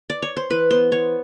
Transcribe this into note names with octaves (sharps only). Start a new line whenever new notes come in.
D5
C#5
C5
E3 B4
B3 C5
B3 C#5